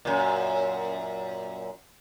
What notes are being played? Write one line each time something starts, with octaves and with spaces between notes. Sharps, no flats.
F#2 A#2